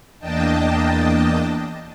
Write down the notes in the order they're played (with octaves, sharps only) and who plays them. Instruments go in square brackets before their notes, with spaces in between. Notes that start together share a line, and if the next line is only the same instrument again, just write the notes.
[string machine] E2 A#3 D4 D#5 G5 A5